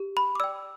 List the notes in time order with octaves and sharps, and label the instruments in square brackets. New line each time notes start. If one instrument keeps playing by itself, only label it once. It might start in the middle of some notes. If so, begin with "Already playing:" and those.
Already playing: [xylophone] G4
B5
D6
D5 G5 E6